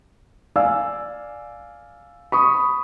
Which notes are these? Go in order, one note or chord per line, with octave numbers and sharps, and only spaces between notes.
D5 F5 G#5 E6
B5 C#6 D#6